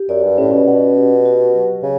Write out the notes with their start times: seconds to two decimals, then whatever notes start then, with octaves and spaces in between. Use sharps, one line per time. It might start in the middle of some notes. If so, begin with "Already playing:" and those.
Already playing: G4
0.09 F#2 D5
0.23 G2
0.38 A2 C#4
0.52 B2
0.67 B2 F#5
0.96 G4
1.25 F#4
1.54 F#3
1.83 C#3